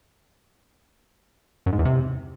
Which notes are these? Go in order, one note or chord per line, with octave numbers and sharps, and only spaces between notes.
F#2
G#2
E2
C3